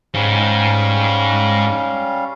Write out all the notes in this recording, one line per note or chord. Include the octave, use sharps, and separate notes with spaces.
G#2 G3 C#4 F5